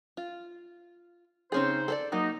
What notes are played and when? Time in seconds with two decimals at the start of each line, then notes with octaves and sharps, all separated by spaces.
0.17 F4
1.52 C#3 C4 C#4 D#4 G#4 C5
1.88 A4 B4 D5
2.12 F#3 A#3 D#4